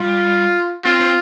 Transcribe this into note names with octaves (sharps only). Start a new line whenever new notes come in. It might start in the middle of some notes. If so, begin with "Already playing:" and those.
Already playing: G3 F4
C4 F4
C4